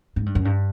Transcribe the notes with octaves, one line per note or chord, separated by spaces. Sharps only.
G#2
G2
F#2
G2